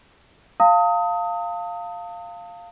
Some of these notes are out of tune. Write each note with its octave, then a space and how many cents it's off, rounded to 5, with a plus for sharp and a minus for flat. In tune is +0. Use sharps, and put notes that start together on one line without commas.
F5 +0 A5 +40 D#6 +20